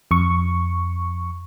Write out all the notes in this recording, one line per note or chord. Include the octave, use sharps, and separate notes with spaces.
F2 C#6